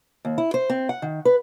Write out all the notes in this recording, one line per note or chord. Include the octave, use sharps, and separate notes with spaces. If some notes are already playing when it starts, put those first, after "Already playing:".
D#2
E4
C5
C4
F#5
D#3
B4